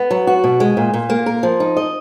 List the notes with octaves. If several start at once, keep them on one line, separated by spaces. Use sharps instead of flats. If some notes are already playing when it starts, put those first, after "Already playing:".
Already playing: B3
F#3
F#4
B2
G#3
A#2
A#2
A#3
A#4
F3
D#4
D#5